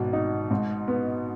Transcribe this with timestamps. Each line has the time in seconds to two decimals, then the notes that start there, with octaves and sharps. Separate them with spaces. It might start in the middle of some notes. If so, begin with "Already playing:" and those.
Already playing: G#1 B2
0.13 D#4
0.51 G#2
0.88 B3